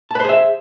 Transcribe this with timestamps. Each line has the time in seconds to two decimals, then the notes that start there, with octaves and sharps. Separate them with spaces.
0.11 A5
0.15 B4
0.20 C5
0.24 G#4
0.29 E5